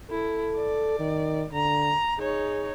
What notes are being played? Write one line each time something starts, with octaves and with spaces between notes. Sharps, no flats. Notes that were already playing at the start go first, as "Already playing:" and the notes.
E4 A4
D5
D#3
D3 A#5
D#4 G#4 C#5